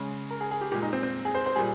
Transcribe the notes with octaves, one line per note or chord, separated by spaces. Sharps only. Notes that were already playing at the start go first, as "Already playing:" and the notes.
Already playing: C#3 G#3
A#4
G#4
G#4
G4
A#2 G#3 G4
D#4
C4
C4
G#4
C5
C5
A#2 G3 G#4